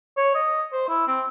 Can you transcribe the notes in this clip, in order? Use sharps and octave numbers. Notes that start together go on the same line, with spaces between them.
C#5
D#5
C5
E4
C4